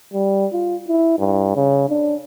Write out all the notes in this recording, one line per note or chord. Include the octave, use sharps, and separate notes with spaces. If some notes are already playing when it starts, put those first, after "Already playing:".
G3
F4
E4
G2
C#3
D4